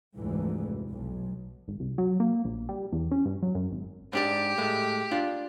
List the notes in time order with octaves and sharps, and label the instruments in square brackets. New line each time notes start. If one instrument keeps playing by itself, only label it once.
[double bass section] F1 D2 G#2 E3
B1
[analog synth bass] G#1
C2
F#3
A#3
A#1
G3
E2
C#4
G2
F#3
F#2
G#1
[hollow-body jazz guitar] G#2 D4 D5 [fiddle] G4
[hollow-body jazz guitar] A2 G#3 A3
D4 F4